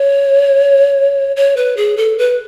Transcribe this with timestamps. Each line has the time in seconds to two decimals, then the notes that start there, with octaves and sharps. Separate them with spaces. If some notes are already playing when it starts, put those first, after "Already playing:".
Already playing: C#5
1.36 C#5
1.57 B4
1.77 G#4
1.97 A4
2.18 B4